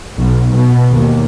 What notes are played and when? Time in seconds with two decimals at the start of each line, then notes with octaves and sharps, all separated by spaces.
0.16 B1
0.55 B2
0.92 D#2